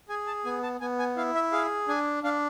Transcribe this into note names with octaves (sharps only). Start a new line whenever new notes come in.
G#4 G#5
A5
B3 G#5
A5
B3 G#5
G#5
E4 F5
E5
G#4 F5
D4 G#5
D4 F5